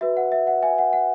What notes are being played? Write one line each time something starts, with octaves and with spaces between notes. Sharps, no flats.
F#4 B4 E5
F#5
E5
F#5
E5 G#5
F#5
F#5